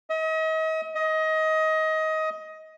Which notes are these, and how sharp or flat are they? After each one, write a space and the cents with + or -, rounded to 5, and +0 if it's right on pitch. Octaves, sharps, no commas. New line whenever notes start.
D#5 +40
D#5 +20